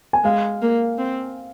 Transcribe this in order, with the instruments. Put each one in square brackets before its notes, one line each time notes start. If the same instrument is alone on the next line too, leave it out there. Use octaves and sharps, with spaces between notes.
[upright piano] G#5
[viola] G#3 [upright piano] F5
[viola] A#3
C4